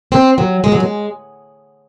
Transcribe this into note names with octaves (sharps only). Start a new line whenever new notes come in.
C4
F#3
G#3
F#3
G#3